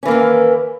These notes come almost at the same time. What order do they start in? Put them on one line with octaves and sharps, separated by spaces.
C#4 E3 A#3 D#3